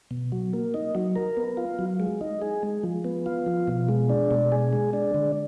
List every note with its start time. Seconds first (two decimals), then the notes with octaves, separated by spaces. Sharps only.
0.11 B2
0.32 F#3
0.53 A#3
0.74 D#4
0.95 F#3
1.16 A#4
1.37 B3
1.57 F4
1.79 F#3
2.00 G#3
2.21 D#4
2.42 G#4
2.63 G#3
2.83 F3
3.04 B3
3.26 F4
3.46 F3
3.68 B2
3.88 G#3
4.09 D4
4.31 B2
4.52 G#4
4.73 G#3
4.93 D4
5.14 D3